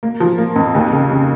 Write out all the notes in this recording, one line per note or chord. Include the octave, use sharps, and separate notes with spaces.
A#3
F3
A#3
F2
D#2
C#3
C#3